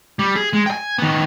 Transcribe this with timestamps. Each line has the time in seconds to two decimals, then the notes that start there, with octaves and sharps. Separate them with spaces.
0.19 G3
0.35 G#4
0.53 G#3
0.66 G5 G#5
0.98 D#3 B3